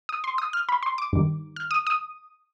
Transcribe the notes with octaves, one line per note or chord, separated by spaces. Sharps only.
D#6
C6
D#6
F6
B5
C6
D6
G2 D#3
F6
D#6
D#6